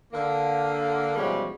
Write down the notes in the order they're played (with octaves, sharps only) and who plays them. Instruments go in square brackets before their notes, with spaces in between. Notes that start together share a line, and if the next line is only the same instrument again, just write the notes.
[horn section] D3 A#3
B2 E3 F3 G3 G#3 C#4